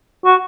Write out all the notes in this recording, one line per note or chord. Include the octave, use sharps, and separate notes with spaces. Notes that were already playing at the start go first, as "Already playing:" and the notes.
F#4